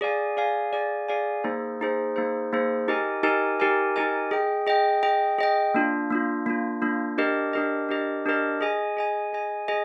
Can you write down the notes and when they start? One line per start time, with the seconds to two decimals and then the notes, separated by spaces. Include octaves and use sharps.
0.01 G#4 D5 F5 G#5
0.37 G#4 D5 F5 G#5
0.73 G#4 D5 F5 G#5
1.08 G#4 D5 F5 G#5
1.44 A#3 D#4 G#4 C5
1.80 A#3 D#4 G#4 C5
2.16 A#3 D#4 G#4 C5
2.53 A#3 D#4 G#4 C5
2.88 D#4 G4 A#4 D#5 G#5
3.23 D#4 G4 A#4 D#5 G#5
3.60 D#4 G4 A#4 D#5 G#5
3.96 D#4 G4 A#4 D#5 G#5
4.31 G#4 D#5 G5
4.67 G#4 D#5 G5
5.03 G#4 D#5 G5
5.39 G#4 D#5 G5
5.74 A#3 D4 F4
6.10 A#3 D4 F4
6.46 A#3 D4 F4
6.82 A#3 D4 F4
7.18 D4 G4 A#4 D#5
7.53 D4 G4 A#4 D#5
7.89 D4 G4 A#4 D#5
8.26 D4 G4 A#4 D#5
8.61 G#4 D#5 G#5
8.97 G#4 D#5 G#5
9.33 G#4 D#5 G#5
9.68 G#4 D#5 G#5